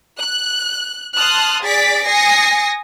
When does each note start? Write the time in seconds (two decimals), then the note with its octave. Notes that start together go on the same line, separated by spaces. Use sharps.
0.19 F#6
1.16 A5 C6 D#6 F6 F#6
1.63 G#4 D5 A6 B6 D7
2.07 G#5 D#6 A#6 C7 C#7